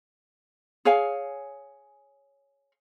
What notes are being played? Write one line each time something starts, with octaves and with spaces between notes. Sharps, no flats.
G#4 C#5 F5 G#5